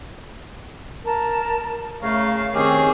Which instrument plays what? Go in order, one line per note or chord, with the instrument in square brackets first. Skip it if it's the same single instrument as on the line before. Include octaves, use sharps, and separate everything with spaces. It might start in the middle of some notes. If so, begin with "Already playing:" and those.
[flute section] A#4 A5
[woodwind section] C#3 A3 [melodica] A#4 C#5 [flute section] F5
[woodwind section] D#3 [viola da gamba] C4 G#4 [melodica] C#4 G4